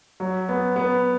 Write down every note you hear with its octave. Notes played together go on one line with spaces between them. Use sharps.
F#3
B3
B3